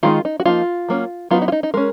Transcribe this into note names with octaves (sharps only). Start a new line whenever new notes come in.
D#3 G#3 D#4 F4
D#4
F#4
F3 A#3 D#4 F4
F#3 A#3 C#4
F#3 B3 D#4 F4
D#4
F4
D#4
D#4
G#3 C#4 A#4